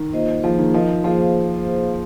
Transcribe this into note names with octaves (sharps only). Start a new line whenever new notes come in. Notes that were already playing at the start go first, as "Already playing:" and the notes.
Already playing: D#3
A#3 F4 C5 D#5
F3 A#3 G#4 C5
D#3
F3 D#4 A#4 D#5
F3 A#3 G#4 C5 F5